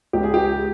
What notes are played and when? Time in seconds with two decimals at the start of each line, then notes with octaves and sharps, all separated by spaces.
0.13 C#2 G4
0.23 G#4
0.34 G4